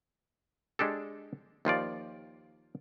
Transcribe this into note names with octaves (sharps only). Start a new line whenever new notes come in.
G#3 D4 G4 A4
D#2 F3 F4 D5